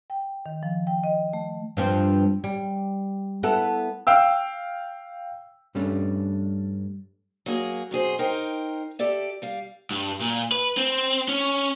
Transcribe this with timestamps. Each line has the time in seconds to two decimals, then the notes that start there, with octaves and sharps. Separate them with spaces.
0.10 G5
0.46 D#3
0.63 F3
0.87 G5
1.04 D#5
1.33 A3
1.77 G2 F3 C4
2.44 G3
3.43 B3 E4 A4
4.07 F5 G5 E6
5.75 G2 G3 A3 C#4 D4
7.46 F#3 A#3 G#4
7.91 F#2 B2 G#4 C5
8.19 D#4 A#4 C5 G5
8.99 G4 A4 D5 E5
9.42 G3 F5
9.91 G2
10.20 A#2
10.52 B4
10.77 C4
11.28 C#4